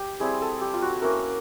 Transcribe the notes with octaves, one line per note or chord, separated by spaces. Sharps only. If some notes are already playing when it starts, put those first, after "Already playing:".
Already playing: G4
G3 C4 E4 G#4
A4
G4
F4
F#4
A#3 C#4 E4 A#4